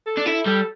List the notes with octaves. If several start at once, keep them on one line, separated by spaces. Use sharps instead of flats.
A4
D4
E4 A4
G3 A4